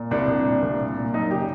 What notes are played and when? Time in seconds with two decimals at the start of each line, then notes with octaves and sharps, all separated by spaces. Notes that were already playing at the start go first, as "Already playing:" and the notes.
Already playing: A#2
0.11 C2 D4
0.27 C2
0.45 A#2
0.62 C2
0.79 A#2
0.97 A#2
1.14 F#2 D#4
1.31 C#3 G4